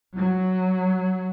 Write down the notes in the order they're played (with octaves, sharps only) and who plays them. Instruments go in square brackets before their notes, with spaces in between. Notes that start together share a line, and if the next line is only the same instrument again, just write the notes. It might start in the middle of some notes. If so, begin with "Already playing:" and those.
[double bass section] F#3